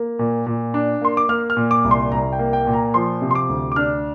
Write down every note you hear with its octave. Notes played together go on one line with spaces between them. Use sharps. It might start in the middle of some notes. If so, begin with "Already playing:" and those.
Already playing: A#3
A#2
A#2
D4
A#3 C6
D6
A#3 F6
F6
A#2
D6
C2
C6
C2 A#5
G5
A#3
G5
A#2
A#5
F3 C6
C3
C6
D6
D2
D6
D4 F6